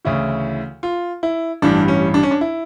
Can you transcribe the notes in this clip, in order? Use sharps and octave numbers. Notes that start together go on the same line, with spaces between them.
D2 C#3 E3 E4
F4
E4
A1 G2 E3 G3 D4
C#4
D4
C#4
D4
E4